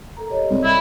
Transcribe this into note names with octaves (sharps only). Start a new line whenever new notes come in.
A4 A#4 A#5
G4 C#5 D#5
C2 G#2
E4